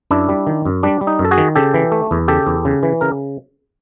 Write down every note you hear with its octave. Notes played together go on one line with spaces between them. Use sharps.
F#2 D4 E4
G3
D#3
F#2
G3 D4
G3
D#4
F#2
A4
F#4 G#4
D#3
C#3 G4 A4
E3
A3
E2
C#3 G4 A4
E2
C#3
E3
C#3 A#4